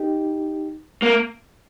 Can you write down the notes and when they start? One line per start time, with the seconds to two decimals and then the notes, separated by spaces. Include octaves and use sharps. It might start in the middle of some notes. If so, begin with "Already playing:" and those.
Already playing: D#4 G4
1.03 A#3